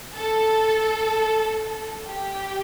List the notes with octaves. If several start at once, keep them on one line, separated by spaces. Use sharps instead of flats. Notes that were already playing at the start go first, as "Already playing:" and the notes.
A4
G4